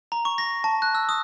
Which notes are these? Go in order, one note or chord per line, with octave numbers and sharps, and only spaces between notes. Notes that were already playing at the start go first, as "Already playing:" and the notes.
A#5
C#6
A#6
A5
F#6
E6
D#6